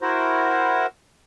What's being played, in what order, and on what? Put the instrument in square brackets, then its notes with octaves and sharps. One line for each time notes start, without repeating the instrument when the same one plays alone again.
[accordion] E4 F#4 A#4 C5